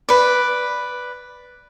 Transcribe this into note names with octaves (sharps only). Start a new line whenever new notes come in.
B4 D5